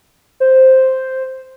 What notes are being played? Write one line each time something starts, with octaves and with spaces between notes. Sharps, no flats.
C5